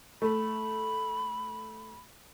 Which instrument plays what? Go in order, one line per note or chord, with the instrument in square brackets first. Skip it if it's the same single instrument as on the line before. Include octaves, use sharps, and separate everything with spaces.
[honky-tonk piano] A3 [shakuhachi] B5